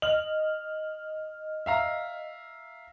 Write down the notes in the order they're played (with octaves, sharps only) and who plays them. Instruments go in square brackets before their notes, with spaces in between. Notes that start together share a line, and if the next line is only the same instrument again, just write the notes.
[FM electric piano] D#5 F6 [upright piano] F#7
[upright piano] E5 F5 A#5